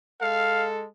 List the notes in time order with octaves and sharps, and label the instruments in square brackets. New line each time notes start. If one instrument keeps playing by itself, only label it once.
[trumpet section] G#3 A4 [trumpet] F5